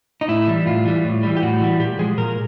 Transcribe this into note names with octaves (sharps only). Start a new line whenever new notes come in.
D#4
A2 E4
E3 G3
A2 F4
E3 G3
A2
E3 G3
G4
A2 F#4
E3 G3
A#2 G4
F3 G#3 G#4
A#2 A#4